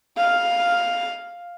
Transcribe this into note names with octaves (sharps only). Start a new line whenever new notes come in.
F5